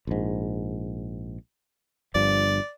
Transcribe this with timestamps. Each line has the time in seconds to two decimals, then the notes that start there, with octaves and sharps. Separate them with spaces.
0.07 A#1 G#2
2.15 G1 G2 F3 D5